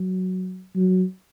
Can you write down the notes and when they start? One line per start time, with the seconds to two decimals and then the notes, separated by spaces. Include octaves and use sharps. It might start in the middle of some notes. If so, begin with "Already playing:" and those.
Already playing: F#3
0.75 F#3